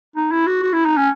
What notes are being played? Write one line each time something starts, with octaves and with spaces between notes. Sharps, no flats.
D#4
E4
F#4
F#4
E4
D#4
C#4